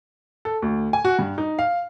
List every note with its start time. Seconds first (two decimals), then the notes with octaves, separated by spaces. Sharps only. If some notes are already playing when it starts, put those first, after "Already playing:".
0.45 A4
0.62 D2
0.93 G#5
1.05 F#4
1.19 G2
1.38 D#4
1.59 F5